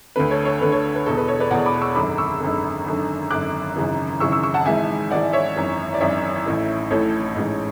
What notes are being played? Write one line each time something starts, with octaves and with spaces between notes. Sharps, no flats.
D2 D3 B4
A4 C#5
A4 C#5
D2 D3 B4
A4 C#5
B4
E1 E2 B2 A4
B4
A4 C#5
B4 D5
E1 E2 B2 D5 F#5
B5 D6
C#6 E6
G#1 F#2 D3 B5 D6
C#6 E6
G#1 F#2 D3
G#1 F#2 D3
G#1 F#2 D3 D6 F#6
G#1 F#2 C#3 E3
G#1 F#2 C#3 E3 C#6 E6
C#6 E6
C#6 E6
F#5 A5
G#1 G#2 E3 E5 G#5
G#1 G#2 E3 D5 F#5
C#5 E5
G#1 F#2 E3
D5
G#1 F#2 E3 C#5 E5
A1 A2 E3
A1 A2 E3 A4 C#5
A1 G#2 E3